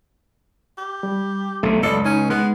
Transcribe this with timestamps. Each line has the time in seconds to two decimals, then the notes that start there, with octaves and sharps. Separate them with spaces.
0.78 G4
1.03 G3
1.63 B1 C3 A3
1.83 C#2 F#2 A4 D5 D#5
2.05 C#4 D#4
2.30 G#3 B3